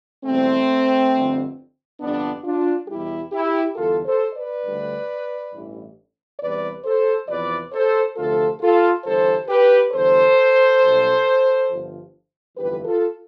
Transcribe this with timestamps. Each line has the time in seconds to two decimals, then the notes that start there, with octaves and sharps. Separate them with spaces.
0.24 E2 B2 G3 A3 C4
1.13 G1 F2 D3
2.00 G1 F2 C3 B3 D4
2.44 D4 F4
2.88 E2 B2 G3 E4 G4
3.32 E4 G4
3.76 E2 D3 G3 F4 A4
4.06 A4 C5
4.35 B4 D5
4.64 D2 D3 G3
5.53 A1 G2 E3
6.40 E2 C3 E3 G3 B4 D5
6.85 A4 C5
7.28 E2 C3 F3 B4 D5
7.72 A4 C5
8.16 D2 C3 F3 F4 A4
8.60 F4 A4
9.04 G1 G2 E3 G3 A4 C5
9.48 G4 B4
9.92 E2 D3 G3 A4 C5
10.80 B1 B2 G3
11.68 G1 G2 F3
12.56 G1 F2 E3 G3 G4 B4
12.85 F4 A4